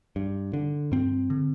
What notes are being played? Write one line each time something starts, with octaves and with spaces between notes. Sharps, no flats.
G2
D3
G2 C4
D3